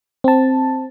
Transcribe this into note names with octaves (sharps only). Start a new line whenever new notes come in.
C4 A5